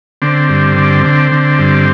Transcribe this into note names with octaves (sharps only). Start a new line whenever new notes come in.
D3 C4
G2
D3
D3
D3
G2